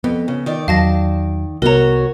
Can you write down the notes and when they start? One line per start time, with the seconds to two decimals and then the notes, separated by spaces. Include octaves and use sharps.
0.04 F2 B3
0.28 C#3
0.46 D#3 D5
0.68 E2 F#3 F5 A5 A#6
1.62 C2 B3 F#4 A#4 C#5 A#5